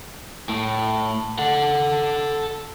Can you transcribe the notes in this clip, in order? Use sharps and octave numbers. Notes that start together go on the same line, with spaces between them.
A2
A4 F#5